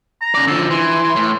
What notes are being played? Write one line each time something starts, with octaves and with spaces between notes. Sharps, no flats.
A#5
C#3 D5
D3 F3 A4
E3 C6
A2